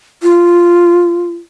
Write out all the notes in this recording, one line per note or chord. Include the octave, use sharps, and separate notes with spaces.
F4